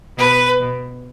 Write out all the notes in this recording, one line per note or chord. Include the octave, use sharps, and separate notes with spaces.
B2 B4
B2